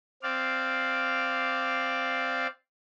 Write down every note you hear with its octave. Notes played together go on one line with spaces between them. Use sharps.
C4 D5 F5